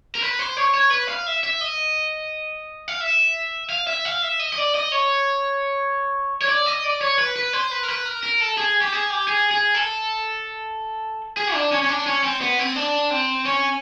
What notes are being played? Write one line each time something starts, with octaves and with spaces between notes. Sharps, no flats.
A#4
B4
C5
C#5
C#5
B4
F5
E5
E5
D#5
F5
E5
F5
E5
F5
E5
D#5
D#5
D5
D#5
C#5
C#5
D5
D#5
D5
C#5
B4
B4
C5
B4
A#4
B4
A#4
A#4
A4
G#4
G4
G#4
G4
G#4
G#4
A4
G#4
D4
C#4
C#4
D4
C#4
C4
B3
C4
D4
C4
C#4